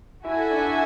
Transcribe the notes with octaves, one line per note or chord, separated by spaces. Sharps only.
E4 F#4 A4 E5 G#5
D4
E4